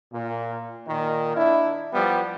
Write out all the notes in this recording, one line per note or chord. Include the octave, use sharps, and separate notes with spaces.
A#2
A#2 D#3
D4 E4
F3 G3 B3